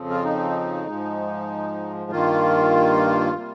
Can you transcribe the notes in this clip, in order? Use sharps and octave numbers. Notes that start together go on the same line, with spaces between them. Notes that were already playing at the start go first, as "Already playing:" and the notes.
Already playing: F2 C#3 F3 C4
F4
D#4
G#2 F3 G#3
G2 D#3 A#3 F4
C3 G3 A#3